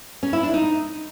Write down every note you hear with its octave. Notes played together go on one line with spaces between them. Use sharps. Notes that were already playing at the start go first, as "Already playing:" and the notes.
C#4
E4
D4
D#4